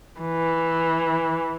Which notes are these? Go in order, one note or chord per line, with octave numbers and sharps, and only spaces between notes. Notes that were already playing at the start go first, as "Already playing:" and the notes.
E3